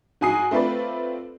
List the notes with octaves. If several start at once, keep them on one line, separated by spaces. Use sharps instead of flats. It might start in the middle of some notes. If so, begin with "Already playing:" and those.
G#2 F#4 G#5 D#6 C7
A3 C4 F4 B4 D5